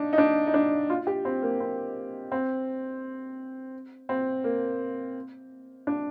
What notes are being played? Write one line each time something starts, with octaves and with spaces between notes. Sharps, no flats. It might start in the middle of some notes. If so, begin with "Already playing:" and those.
Already playing: D4 D#4
D#4
D4
D#4
D4
F4
G4
C4
A#3
C4
C4
C4
A#3
D4